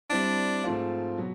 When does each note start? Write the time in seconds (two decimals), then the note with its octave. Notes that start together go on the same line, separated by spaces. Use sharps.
0.10 G3 C4 D4 E4
0.64 G#2 F3 A3 C4 F4
1.17 B2 F#3 B3